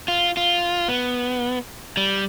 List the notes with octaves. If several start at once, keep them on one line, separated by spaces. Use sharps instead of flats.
F4
F4
B3
G3